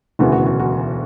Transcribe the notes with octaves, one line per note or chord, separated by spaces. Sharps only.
E1 D2 C#3 E3 B3 F#4
F#4
F#4
F#4